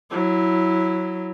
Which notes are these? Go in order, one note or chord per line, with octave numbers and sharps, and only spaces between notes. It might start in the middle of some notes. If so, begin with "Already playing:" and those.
F#3 E4